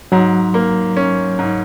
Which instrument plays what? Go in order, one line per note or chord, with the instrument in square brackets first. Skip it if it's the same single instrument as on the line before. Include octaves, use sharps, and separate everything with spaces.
[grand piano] G#2 [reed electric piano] F#3
[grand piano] A#3
C#4
G#2